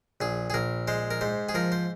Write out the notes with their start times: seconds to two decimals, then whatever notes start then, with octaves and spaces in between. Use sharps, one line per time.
0.21 A#1 G#4
0.50 G#4
0.54 A#1 A#4
0.88 G#3 C5
1.11 A#4
1.21 G#2 C5
1.49 G#4
1.54 F3 A#4
1.72 C5